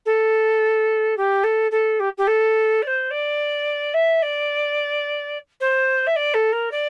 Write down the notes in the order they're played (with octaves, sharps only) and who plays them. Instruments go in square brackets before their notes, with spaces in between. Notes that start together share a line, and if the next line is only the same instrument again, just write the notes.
[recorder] A4
G4
A4
A4
G4
G4
A4
D5
C5
D5
E5
D5
C5
E5
D5
A4
A#4
D5